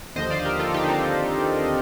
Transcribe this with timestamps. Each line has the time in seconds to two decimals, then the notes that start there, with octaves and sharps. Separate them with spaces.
0.16 D#2 D3 F3 C5 D#5
0.30 D5 F5
0.39 C5
0.45 G4 A#4
0.60 F4 A4
0.74 D#4 G4
0.83 D4
0.89 C4 D#4